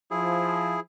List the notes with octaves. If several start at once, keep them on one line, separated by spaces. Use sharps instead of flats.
F3 E4 G#4